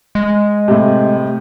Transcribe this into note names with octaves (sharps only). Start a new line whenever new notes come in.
G#3
A2 C3